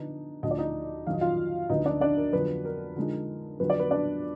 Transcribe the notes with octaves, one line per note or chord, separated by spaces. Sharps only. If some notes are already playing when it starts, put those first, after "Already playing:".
Already playing: D3 F3 B3 D4 D#4
D2 D3 F3 D#5
D5
D#4 D#5
F2 D#3 F#3 F5
D#5
F4 F5
D2 D3 F3 B3 D#4 D#5
D4 D5
D4 D5
A#4
F2 D3 F#3 B3 B4
A#4
D3 F3 G#3 D#4
F2 D3 F#3 B3 B4
D5
B3 B4
D4 D5